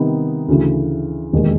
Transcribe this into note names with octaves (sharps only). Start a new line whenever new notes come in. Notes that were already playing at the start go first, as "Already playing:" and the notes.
Already playing: C3 D#3 G3 B3 D#4
D2 C#3 E3
E1 D#2 D#3 G#3